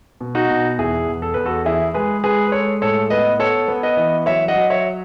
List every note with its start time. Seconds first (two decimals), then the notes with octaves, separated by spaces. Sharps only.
0.21 B2
0.35 D#4 F#4
0.50 B2
0.79 E2 E4 G#4
1.08 E2
1.22 A4
1.34 E2 B4
1.46 F#4 A4
1.65 E3 E4 G#4
1.94 G#3 G#4 B4
2.24 G#3 G#4 B4
2.47 B4
2.52 G#3 A4 C#5
2.82 A2 A4 C#5
3.10 B3 B4 D#5
3.39 B3 A4 C#5
3.68 B3
3.83 B4 D#5
3.97 E3
4.26 F#3 C#5 E5
4.48 D#5 F#5
4.56 F#3
4.70 C#5 E5